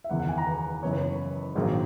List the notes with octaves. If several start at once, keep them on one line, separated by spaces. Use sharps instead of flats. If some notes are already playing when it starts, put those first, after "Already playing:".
E5
F#1 E2 D#3 F#5
F#5
G#5
A#5
B4
F#1 F#2 E3 B3 C#5
B4
C#5
A#1 G#2 D#3 F#3 A#3